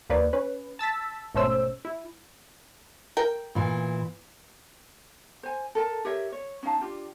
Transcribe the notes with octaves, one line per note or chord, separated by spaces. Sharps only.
D#2 A#3 B4 D5
C#4 B4
A5 E6 A6 B6
G#1 B2 A3 C#4 C5 E6
E4
A#4 G5
A#2 E3
C5 G#5
A4 A#4 A5
G4 A#4 C#5 E5
C#5
C#4 D#4 F5 A5
D4 F4 G4